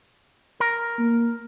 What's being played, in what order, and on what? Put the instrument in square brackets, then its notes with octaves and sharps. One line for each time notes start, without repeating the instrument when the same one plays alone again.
[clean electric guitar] A#4
[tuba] A#3